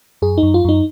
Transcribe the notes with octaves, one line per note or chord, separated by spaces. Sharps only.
F#2 G#4
D#4
F#2
F4
F#2 D#4